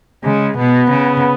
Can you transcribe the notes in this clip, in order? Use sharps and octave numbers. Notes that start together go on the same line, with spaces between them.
C#3 G#3
B2 B3
C#3